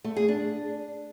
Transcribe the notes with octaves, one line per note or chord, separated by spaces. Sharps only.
A3
G#4
D4